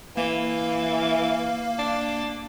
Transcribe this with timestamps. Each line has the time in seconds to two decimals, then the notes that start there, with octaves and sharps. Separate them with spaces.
0.17 E3 A#3 F5
1.79 D4